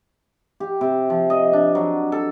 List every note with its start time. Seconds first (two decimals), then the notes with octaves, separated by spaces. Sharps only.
0.60 G4
0.81 C3
1.10 F3
1.30 D#5
1.53 D4
1.75 F#3
2.12 A4